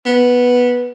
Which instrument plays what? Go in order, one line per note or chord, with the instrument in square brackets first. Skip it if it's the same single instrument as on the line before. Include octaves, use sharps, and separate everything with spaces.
[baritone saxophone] B3